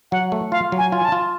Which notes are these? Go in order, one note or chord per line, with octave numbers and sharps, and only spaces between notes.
F#3 F#5
A3
F4 F5
F#3
G#5
F4
G#5
A5
F4